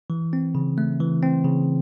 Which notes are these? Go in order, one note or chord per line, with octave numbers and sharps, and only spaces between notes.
E3
C4
C#3
A3
E3
C4
C#3